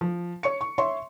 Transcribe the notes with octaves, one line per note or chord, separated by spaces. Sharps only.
F3
C#5 C#6 C#7
C#6
C#5 E5 C6 C#6